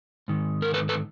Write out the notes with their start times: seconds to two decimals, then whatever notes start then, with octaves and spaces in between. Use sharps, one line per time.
0.28 G#2 D#3
0.62 A#4
0.74 A4 B4
0.89 A4 B4